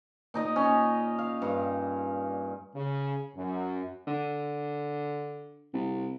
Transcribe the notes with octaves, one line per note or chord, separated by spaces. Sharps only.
A#2 D#4 D#5
C#4
F5
G2
C#3
F#2
D3
C2